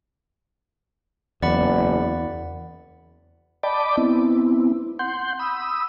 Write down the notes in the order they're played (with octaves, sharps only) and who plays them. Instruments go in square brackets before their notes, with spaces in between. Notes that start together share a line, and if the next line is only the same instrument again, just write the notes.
[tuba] F#1 [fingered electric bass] E2 [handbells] D5 F#5 B5
[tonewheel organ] D5 D#5 G5 A5 B5 D6
B3 C4 E4
F#5 C6 G6
B5 D#6 E6